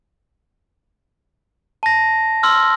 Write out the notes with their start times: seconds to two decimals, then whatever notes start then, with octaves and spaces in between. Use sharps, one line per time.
1.83 A5 A#6
2.43 C6 E6 F6